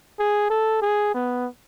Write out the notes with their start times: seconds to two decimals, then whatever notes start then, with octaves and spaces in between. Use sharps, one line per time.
0.19 G#4
0.50 A4
0.82 G#4
1.14 B3